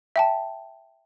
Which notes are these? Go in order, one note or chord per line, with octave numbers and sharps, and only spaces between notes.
E5 G5 A5